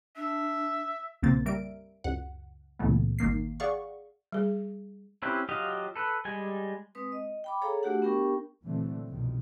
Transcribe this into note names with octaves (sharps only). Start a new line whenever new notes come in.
D4 E5
B1 F#2 C#3 A#3 C4 A6
G3 A#4 E5 D7
C#2 F#2 F#5
C#2 A#2 E3 A3 B3
G#1 D#3 A#3 C7
G#4 D5 F5 F#5 C#6
G3 G#4
C4 C#4 E4 G4 B4
F#3 F4 G4 D#5 F5
A4 B4
G3 G#3 G#5
G#3 C4 B4 D#6
D#5
G5 B5 D6
G#4 A4 C#5 F5 A#5
A3 D4 F#4 G4 F#5
B3 D4 G4 A#4 G5 C#6
A#2 D3 E3 F#3 A3 C4
C2 F#2 B2 D#3 F3